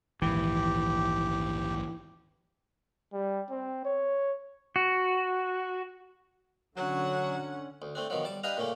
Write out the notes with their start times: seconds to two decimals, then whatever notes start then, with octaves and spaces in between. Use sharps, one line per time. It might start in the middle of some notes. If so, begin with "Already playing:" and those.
0.22 A#1 D#2 G#2 E3 G4
3.13 G3
3.50 C4
3.85 C#5
4.76 F#4
6.77 D3 F#3 C#4 F#4 F#5
7.82 D2
7.95 A3 C4 D4
8.10 B2 D#3 F3 F#3
8.24 G3 A5 D6
8.43 D4 G4 B4 D#5 F5 A#5
8.57 A#2 C#3 A3 A#3